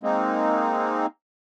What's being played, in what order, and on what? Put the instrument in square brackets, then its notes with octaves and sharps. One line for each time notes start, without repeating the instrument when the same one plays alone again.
[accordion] G#3 A#3 C4 D#4